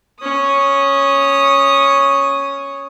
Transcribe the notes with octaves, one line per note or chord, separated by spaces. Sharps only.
C#4 D#6